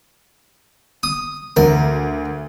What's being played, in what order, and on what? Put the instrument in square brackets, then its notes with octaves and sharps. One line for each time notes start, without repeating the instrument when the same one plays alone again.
[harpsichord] D#6
[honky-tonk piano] D2 [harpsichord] A#4